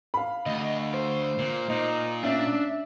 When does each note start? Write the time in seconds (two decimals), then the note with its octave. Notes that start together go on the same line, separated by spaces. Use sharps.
0.14 F5 B5
0.46 D2 D#5
0.94 C5
1.38 A#2
1.69 A#2 D#4
2.24 C#4 D4 E5